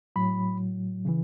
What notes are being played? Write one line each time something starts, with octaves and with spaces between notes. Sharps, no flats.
A2 F#3 B5
C#3 E3